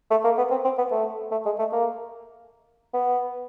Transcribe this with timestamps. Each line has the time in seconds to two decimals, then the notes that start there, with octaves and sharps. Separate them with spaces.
0.11 A3
0.24 A#3
0.38 B3
0.51 C4
0.65 C4
0.78 B3
0.92 A3
1.31 A3
1.45 G#3
1.59 A3
1.72 A#3
2.94 B3